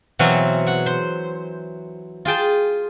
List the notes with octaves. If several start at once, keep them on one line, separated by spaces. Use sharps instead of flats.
B2 E3 F#3 C4 F5 G#5
C#5 F#5
C5
F4 G#4 G5 A5